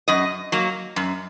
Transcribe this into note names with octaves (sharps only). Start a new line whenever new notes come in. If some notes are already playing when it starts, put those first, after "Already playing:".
F#2 D#5
F#3 A#3
F#2